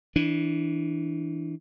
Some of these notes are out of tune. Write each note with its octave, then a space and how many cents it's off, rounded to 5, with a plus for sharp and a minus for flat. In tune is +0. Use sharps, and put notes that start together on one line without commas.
E3 -15 D4 +0